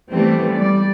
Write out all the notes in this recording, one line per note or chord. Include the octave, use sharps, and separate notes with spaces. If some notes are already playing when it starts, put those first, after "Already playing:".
E3 G3 A3 B3 C4
G3 D5